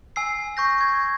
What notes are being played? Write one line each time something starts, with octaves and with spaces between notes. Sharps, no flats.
G#5 E6 C7
C#6 G6 A#6
G#6